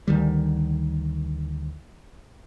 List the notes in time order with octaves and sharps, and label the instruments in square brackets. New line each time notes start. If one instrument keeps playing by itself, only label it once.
[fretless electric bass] D2 D#3 G3